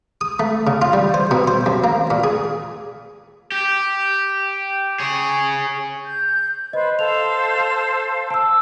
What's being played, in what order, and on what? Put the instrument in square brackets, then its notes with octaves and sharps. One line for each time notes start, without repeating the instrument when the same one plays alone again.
[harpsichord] D#6
A3
C#3
F4
G3
C5
B2
C5
F#2
A#3
A#2
G#4
[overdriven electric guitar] G4
G#4 C#5
[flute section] G6
[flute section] B4 C5 [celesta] D#5
[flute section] A4 C5 F5 [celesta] F7
[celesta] A5 E6